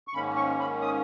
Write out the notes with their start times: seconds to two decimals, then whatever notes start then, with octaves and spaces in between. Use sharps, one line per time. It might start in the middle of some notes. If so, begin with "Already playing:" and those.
0.08 C#6
0.14 G#2 D#3 A#3 C#4 B5
0.36 C#6
0.60 B5
0.81 D#6